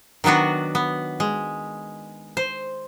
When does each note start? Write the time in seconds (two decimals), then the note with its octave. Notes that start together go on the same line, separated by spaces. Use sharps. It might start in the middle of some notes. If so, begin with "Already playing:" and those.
0.24 D#3 F#3 B3 D4 F#4
0.75 B3
1.20 G#3
2.37 C5